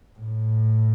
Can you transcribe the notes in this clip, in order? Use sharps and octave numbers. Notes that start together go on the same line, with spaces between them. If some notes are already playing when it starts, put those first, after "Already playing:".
A2